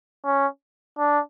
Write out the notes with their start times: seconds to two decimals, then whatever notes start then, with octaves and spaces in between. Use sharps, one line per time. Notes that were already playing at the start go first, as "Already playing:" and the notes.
0.25 C#4
0.98 D4